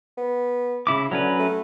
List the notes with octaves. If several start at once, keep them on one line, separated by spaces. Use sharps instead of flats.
B3
C#3 E4 D6
D3 F#3 C#4 B4
A3